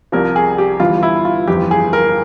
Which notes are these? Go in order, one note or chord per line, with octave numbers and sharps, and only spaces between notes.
C2 C3 F3 A#4
G#4
G4
G1 G2 E3 F4
E4
F4
G1 F2 E3 G4
G#4
A#4